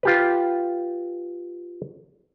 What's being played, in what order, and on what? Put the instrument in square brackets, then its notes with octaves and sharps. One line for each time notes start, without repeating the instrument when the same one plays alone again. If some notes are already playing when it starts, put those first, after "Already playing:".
[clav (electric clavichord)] F4 G4 B4